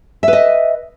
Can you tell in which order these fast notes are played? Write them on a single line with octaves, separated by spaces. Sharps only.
E5 B4 D#5